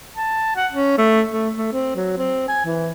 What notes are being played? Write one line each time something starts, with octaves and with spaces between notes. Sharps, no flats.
A5
F#5
C#4
A3
A3
A3
C4
F#3
C4
G#5
E3